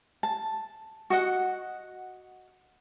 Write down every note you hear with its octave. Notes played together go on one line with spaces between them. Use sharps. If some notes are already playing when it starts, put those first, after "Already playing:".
A5
F#4 D#5 F#5